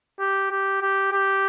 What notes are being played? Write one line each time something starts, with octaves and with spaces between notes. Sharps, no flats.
G4
G4
G4
G4